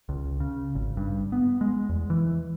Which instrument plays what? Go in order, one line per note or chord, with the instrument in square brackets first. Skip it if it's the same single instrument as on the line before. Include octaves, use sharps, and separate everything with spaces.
[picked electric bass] C#2
C#3
G#1
G2
B3
G#3
E2
E3